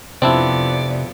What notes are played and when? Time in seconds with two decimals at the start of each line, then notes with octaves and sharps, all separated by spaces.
0.22 F2 C3 B3 C4 D4 E4 D5